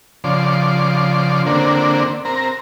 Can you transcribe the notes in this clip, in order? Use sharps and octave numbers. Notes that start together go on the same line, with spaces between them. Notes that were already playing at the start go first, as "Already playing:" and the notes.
C#3 F3 D5 C6
D3 A#3 C4 D4
C4 A#4 A#5